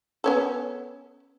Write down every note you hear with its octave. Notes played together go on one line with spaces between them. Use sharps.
B3 C#4 A4